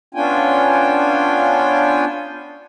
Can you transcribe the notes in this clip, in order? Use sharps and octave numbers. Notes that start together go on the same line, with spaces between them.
B3 C#4 D4 F4 G5 G#5